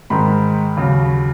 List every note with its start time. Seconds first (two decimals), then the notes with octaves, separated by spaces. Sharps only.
0.10 G#2 D#3 G#3 B5
0.77 D#2 C#3 F#3